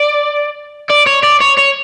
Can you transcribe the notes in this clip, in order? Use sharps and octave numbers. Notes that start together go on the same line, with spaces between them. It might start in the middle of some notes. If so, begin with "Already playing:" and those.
Already playing: D5
D5
C#5
D5
C#5
C#5